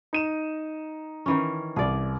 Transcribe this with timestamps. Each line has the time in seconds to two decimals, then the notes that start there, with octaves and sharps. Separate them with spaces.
0.13 D#4 D#7 E7
1.26 D#3 E3 C#4
1.76 C2 G#4 D5